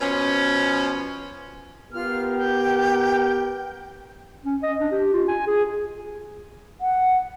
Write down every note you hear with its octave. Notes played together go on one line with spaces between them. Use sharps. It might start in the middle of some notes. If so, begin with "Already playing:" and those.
B2 F3 C#4
B3 F4 G4 A#4 F6
G5
C#4
D#5
D4
G4
F4
G#5
G#4
F#5